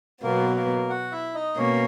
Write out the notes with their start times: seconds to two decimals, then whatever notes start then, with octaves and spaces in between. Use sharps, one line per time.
0.23 B2 F#3 A#3 B3 A#4
0.56 A#3 A#4
0.90 F#4 F#5
1.12 E4 E5
1.34 D#4 D#5
1.56 B2 A#3 C#4 C#5